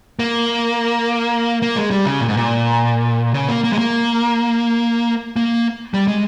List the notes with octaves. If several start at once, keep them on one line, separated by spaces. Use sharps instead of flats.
A#3
A#3
G#3
G3
C#3
A#2
G#2
A#2
C#3
A#3
A#3
G#3
A#3
A#3
G3
G#3